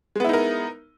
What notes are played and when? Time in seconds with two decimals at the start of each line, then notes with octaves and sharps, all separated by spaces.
0.15 G#3
0.20 B3
0.24 E4
0.29 D#4
0.33 A#4